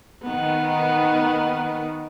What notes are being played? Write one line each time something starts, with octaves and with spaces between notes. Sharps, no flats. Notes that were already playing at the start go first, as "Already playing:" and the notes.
D#3 B3